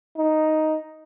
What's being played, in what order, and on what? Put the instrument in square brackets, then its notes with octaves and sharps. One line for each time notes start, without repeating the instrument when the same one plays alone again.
[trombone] D#4